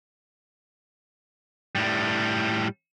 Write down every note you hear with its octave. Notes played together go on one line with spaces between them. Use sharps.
A2 G3